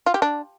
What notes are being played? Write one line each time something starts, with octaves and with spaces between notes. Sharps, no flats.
F4
G4
D4